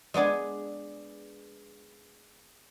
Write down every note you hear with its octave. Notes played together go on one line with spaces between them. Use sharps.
G#3 B3 D4 G#4